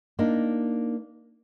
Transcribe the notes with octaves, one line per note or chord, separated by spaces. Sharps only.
A#3 D4 D#4